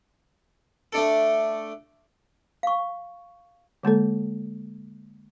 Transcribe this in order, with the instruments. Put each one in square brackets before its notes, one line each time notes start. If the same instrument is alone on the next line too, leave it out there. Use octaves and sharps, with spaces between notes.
[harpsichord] A3 D4 A4
[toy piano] F5 C#6
[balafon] D3 G#3 A#3 A4